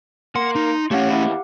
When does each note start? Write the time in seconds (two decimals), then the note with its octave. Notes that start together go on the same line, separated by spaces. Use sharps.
0.36 A#3 F#5 C6
0.56 D#4
0.91 A3 C#4 G4 C#5 F5 F#5
1.10 D#2 E4